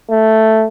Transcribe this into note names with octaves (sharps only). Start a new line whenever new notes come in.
A3